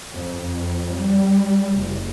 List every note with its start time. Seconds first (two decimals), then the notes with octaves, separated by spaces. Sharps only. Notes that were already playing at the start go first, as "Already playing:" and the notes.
0.11 F2
0.93 G3
1.74 F#1